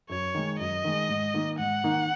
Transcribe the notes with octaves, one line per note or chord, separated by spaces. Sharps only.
F#2 C#5
D#3 G#3
F#2 D#5
D#3 G#3
G#2
D#3 A#3 D#4
G#2 F#5
D#3 A#3 D#4